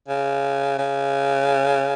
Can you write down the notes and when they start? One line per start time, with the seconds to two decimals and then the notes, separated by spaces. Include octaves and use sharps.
0.08 C#3
0.79 C#3